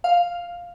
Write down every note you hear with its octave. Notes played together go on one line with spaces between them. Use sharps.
F5